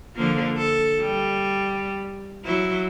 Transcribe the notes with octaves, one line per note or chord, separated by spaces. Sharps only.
D3 F3 A#3
A4
G3
F#3 E4